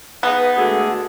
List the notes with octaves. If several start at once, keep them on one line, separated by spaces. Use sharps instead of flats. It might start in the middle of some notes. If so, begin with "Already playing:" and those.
B3 D#4 G#4 B4
D3 G#3 A3 F#4 G#4